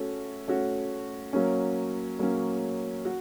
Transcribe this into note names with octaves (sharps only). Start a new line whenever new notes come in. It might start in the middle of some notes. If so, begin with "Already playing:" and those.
Already playing: A3 C#4 F#4
A3 C#4 F#4
F#3 A#3 C#4
F#3 A#3 C#4
F#4